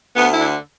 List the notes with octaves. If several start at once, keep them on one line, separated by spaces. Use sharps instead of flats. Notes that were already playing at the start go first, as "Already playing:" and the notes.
D2 B3
E4
D3